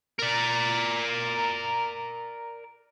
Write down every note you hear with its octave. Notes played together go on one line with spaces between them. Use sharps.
A#4 D5